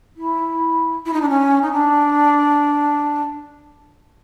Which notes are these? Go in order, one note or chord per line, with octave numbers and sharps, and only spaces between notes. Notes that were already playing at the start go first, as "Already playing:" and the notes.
E4
E4
D#4
D4
C#4
D#4
D4